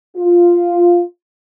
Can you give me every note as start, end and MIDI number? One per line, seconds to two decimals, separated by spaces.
0.17 1.01 65